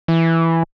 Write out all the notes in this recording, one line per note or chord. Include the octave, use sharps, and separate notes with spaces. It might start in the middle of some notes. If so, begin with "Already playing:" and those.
E3